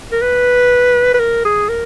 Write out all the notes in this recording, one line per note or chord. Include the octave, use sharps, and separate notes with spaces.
A#4
B4
B4
A#4
G#4
A#4